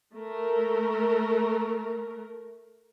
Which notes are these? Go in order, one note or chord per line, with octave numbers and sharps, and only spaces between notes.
A3 A#4